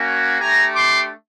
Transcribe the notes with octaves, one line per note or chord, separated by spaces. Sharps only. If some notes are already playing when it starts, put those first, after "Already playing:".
Already playing: A#3 C#4 F#4
A3 D4 G4 G#5 A#5
C6 D6